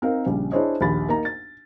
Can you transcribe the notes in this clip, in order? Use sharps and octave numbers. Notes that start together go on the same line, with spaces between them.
C4 D#4 A#4 F5
A#1 C#3 G3
D4 E4 G#4 C5 C#5 D#5
A#1 D#2 B5 A6
A#3 D#4 A#5
A6